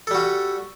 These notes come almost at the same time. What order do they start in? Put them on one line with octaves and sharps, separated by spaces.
A4 G3 F#4